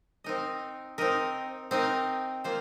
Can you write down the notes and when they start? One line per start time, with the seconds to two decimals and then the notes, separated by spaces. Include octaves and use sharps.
0.24 C4 D#4 A#4 D#5
0.98 C4 D#4 A#4 D#5
1.71 C4 D#4 A#4 D#5
2.44 A#3 F4 C5